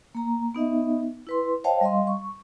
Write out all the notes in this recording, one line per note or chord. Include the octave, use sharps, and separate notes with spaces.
A#3 A#5
B3 D#4 D#5 E5
E4 B4 C6
C5 C#5 D#5 F5 G5 A5
G3 D#5 F5 C6
C#6